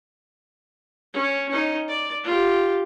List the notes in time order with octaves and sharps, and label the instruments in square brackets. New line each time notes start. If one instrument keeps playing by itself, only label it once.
[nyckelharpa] C#4
C#4 D#4
D5
F4 G4